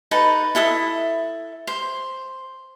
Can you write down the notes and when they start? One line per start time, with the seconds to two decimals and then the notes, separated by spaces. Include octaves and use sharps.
0.11 D#4 A4 B4 A5
0.55 E4 A4 E5 D#6
1.67 C5